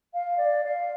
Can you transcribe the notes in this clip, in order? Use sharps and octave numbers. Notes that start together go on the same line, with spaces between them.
F5
D5
F5